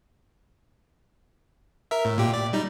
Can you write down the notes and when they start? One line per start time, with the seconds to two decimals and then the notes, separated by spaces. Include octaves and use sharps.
1.91 A#4 E5
2.05 A2
2.18 A#2 G4
2.34 D5
2.53 G3 D#4